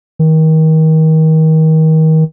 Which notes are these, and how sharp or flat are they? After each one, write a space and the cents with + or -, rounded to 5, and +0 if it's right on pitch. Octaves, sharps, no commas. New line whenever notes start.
D#3 +30